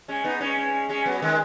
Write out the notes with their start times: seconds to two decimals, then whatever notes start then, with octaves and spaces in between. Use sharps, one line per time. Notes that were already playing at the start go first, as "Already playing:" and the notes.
0.08 G#3 C#4
0.24 B3 D#4
0.41 G#3 C#4
0.89 G#3 C#4
1.06 F#3 B3
1.22 D#3 G#3